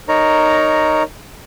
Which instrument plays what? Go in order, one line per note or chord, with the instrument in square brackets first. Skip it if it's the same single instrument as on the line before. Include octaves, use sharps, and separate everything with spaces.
[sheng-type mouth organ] D#4 A#4 C#5 A#5